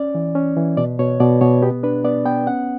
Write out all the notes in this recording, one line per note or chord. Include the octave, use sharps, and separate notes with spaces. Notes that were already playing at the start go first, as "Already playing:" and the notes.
Already playing: C#4 D5
E3
C#4
E3
B2 D5
B2 C#5
B2 D5
B2 C#5
B3 G4
D4 B4
B3 D5
B3 G5
C#4 F#5